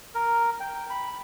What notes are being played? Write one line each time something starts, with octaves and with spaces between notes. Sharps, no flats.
A#4
G5
B5